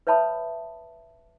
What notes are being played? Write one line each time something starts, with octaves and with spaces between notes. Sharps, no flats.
B4 C#5 E5 A5 B5 D#6